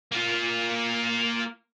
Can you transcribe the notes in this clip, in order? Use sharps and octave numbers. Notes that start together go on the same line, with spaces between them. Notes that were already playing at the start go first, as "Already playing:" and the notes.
A#3 F4